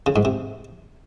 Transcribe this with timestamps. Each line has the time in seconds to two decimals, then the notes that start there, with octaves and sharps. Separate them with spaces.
0.06 C#3
0.16 G#2
0.25 C3